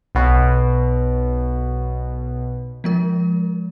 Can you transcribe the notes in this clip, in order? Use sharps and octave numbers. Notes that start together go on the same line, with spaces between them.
B1 B2
F3 G#3 A#4